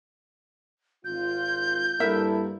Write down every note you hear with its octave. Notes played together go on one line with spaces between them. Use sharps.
G#1 F4 G6
G2 A#3 E4 A4 A#4 E5